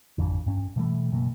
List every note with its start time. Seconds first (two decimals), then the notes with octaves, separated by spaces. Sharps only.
0.18 G#1 F2 D3
0.46 G2 C#4
0.76 B2 E3 G3 A3
1.12 F#1 B2 F#3 A#3